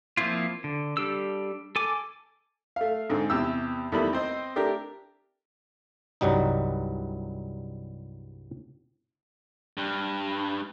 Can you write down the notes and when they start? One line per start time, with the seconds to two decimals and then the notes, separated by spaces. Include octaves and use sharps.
0.17 F3 A#3 C4 E4 F4
0.64 D3
0.97 G3 D4 G4 A4 E6
1.76 A4 G#5 D6
2.76 A3 F5
3.10 G#2 D3 C4
3.30 E2 C3 G4 E6
3.92 E2 D#3 G3 A3 E4 B5
4.13 C4 C5 D#5
4.56 A3 D4 G4 A#4
6.21 C2 G2 F#3 G3 D#4
9.77 G2